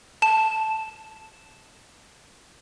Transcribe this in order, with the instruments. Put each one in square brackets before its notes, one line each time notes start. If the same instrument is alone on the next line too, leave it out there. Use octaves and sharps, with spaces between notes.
[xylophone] A5 E7